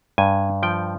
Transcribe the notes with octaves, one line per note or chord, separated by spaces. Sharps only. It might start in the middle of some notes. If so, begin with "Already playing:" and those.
G2 G#5
F3 G5